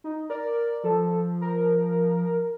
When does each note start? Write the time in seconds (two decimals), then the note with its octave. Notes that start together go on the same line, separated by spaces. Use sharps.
0.04 D#4
0.30 A#4 D5
0.84 F3 A4
1.41 A#4